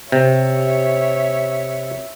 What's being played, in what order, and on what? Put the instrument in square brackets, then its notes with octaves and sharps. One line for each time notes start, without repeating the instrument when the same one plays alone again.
[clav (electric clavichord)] C3 [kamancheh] C#5 E5